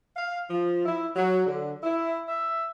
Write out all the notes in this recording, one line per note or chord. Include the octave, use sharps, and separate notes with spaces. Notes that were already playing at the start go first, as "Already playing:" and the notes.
F5
F3
E4
F#3
D3
E4
E5